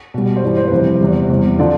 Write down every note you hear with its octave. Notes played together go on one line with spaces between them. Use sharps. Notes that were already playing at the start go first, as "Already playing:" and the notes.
B2 G3
C5
G2 E3 G3 D5
C5
B4
F2 C3 E3 G3 C5
E2 C3 G3
E2 C3 G3
D3 F3 D5